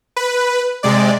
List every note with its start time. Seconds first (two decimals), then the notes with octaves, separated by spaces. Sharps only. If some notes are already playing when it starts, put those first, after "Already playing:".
0.16 B4
0.83 C3 G#3 D5